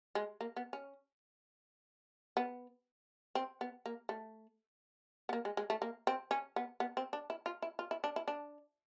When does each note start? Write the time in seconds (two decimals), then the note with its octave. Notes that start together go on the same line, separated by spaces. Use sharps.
0.15 G#3
0.41 A#3
0.56 B3
0.73 C#4
2.37 B3
3.35 C4
3.61 B3
3.86 A#3
4.09 A3
5.29 B3
5.33 A#3
5.45 G#3
5.57 G#3
5.70 A3
5.82 A#3
6.07 C4
6.31 C#4
6.56 B3
6.80 B3
6.97 C4
7.13 D4
7.30 E4
7.46 F4
7.62 E4
7.79 F4
7.91 E4
8.04 D4
8.16 E4
8.28 D4